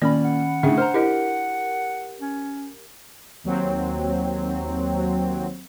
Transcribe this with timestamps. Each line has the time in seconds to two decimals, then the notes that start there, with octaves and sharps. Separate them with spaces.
0.02 A#2 D#3 C#4 D5 B5
0.24 F#5
0.63 A2 C#3 D4 E5 G5
0.78 C5 A#5 F6
0.94 E4 G4 A#4 D#5
2.21 C#4
3.44 D#2 F#3 C4